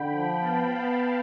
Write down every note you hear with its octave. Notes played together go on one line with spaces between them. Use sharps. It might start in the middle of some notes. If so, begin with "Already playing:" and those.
Already playing: D3 G5 B5
F3
B3 F5 A5
B3 F5 A5